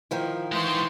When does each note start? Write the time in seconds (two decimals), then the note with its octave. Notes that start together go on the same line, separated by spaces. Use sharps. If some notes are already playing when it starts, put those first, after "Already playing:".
0.11 D#3 F3 E4
0.52 E3 G#3 C5 C6 C#6